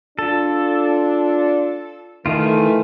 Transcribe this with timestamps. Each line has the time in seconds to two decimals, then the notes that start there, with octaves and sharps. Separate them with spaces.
0.19 D4 F4 A4
2.26 D#3 E3 A3 F4